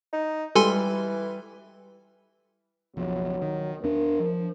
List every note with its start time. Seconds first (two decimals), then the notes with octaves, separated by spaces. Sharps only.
0.13 D#4
0.56 E3 G3 A4 G#5 C6
2.96 F#1 B1 F3 F#3
3.42 D#3
3.83 E2 D4 A#4
4.19 F3